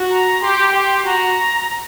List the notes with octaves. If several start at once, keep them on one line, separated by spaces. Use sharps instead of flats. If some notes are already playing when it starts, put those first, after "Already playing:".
Already playing: F#4
A#5
G4 C6
G4 C6
F#4 A#5